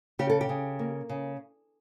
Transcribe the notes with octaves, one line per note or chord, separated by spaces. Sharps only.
C#3 G4
A4
G4
C#3
A#3
C#3